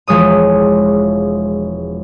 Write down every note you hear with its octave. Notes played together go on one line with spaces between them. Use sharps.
E1 F3 G#3 C#5 D#6